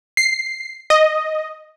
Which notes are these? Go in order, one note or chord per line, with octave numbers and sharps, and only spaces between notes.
C7
D#5